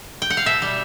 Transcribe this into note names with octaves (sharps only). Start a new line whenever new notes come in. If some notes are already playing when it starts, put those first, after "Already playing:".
G5
F#5
F5
B2 E5
G3